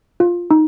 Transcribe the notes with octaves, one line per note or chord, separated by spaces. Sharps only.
F4
D#4